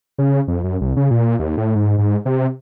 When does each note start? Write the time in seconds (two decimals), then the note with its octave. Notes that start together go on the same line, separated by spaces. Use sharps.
0.18 C#3
0.48 F2
0.64 F#2
0.81 C2
0.97 C#3
1.11 A#2
1.39 D#2
1.57 A2
1.75 G#2
1.98 G#2
2.25 C3